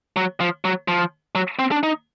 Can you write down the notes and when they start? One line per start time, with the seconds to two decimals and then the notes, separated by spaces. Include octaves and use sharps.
0.16 F#3
0.40 F3
0.65 F#3
0.88 F3
1.35 F#3
1.59 C4
1.72 D4
1.83 D#4